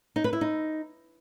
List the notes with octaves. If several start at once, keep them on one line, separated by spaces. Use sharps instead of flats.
D#4
B4
E4
D#4